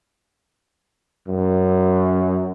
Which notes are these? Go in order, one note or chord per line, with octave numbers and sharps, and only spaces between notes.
F#2